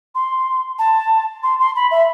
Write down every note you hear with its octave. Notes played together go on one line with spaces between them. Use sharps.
C6
A5
C6
C6
B5
E5